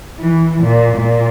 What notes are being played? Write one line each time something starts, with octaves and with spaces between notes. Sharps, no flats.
E3
A#2
A#2